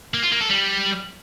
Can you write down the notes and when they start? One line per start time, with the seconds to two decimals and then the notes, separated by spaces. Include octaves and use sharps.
0.14 A#3
0.23 F4
0.32 A#3
0.41 A4
0.50 G3